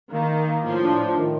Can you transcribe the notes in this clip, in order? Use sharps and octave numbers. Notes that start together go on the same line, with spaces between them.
D#3 A#3
A#3
A#3
A2 F3
D4
A2
D#3